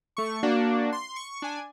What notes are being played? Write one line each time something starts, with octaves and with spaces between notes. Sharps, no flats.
A3 C#6
A#3 D4 F#4
C6
C#6
D4 G#5